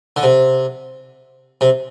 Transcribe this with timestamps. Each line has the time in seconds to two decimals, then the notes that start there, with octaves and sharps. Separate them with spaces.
0.16 D3
0.23 C3
1.61 C3